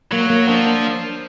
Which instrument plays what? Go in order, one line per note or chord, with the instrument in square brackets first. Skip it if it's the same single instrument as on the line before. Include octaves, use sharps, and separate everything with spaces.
[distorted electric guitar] F#3 [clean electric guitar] A#3
[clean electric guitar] A#3
[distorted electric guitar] F3 [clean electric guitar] D4